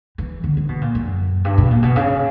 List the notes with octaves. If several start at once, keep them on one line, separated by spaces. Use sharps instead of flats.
E3
D3
D3
B2
A#2
F#2
G2
B2
A#2
B2
C#3